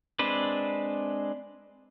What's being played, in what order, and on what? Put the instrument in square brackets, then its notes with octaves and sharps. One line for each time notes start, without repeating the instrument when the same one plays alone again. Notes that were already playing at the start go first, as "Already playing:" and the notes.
[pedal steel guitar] G#3 C4 D4 B4